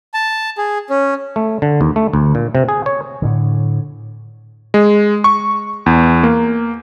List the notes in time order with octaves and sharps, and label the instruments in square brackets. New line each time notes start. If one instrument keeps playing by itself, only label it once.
[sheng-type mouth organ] A5
G#4
C#4
[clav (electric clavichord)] A3
D3
D#2
A3
D2
A#2
C3
G#4
C#5
[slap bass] A2 D3
[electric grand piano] G#3
C#6
E2
A#3